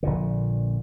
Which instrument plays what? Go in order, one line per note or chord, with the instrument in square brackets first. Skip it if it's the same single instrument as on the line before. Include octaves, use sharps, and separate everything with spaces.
[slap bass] A#1 A#2 D3